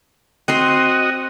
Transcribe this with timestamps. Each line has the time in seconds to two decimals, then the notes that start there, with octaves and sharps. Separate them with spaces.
0.48 C4 F#4 C5 D#5 C6